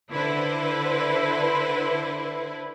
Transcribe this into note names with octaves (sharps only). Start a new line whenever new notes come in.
D3 E4 B4 C5